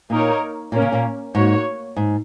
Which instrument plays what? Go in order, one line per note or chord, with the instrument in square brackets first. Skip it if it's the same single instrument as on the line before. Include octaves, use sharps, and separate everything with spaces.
[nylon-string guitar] A#2 [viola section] A#3 D#4 A#4 C#5
[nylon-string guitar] A#2 [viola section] A#3 C#4 A#4
[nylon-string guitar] C#3
A#2
[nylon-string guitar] G#2 [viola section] A#3 F#4 C#5
[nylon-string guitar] G#2